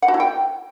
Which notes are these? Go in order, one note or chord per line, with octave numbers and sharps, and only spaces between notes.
F#5
F#4
E4
G5